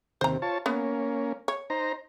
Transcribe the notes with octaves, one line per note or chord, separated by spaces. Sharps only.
D#2 C3 C5 A#5
F4 C#5 A5
A#3 B3 C#4
C#5
D#4 C5 A#5